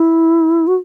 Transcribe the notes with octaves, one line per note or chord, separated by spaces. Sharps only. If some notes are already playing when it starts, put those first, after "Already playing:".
Already playing: E4
F#4